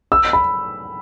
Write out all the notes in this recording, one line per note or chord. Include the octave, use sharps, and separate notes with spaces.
E6
B5